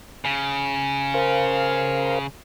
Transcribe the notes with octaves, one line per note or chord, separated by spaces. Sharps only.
C#3
A#4 C5 F5